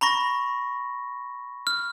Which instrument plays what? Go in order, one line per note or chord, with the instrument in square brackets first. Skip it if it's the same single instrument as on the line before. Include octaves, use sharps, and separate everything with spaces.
[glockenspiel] A#5 B5 C#6 A#6
F6